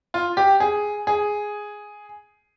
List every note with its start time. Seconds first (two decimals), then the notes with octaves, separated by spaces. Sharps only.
0.14 F4
0.37 G4
0.60 G#4
1.07 G#4